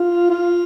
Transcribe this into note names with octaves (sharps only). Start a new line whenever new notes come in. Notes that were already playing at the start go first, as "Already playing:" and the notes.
Already playing: F4
F4